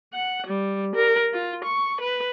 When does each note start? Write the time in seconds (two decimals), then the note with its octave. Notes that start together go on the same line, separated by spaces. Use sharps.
0.14 F#5
0.47 G3
0.95 A#4
1.33 F4
1.64 C#6
2.00 B4